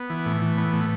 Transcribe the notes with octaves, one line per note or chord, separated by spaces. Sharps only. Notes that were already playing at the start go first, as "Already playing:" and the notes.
Already playing: B3
E3
A2
E3
B3
A2